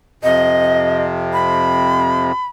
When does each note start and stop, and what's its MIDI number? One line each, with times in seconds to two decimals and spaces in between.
0.23 2.32 41
0.23 2.32 48
0.23 1.03 75
1.33 2.46 83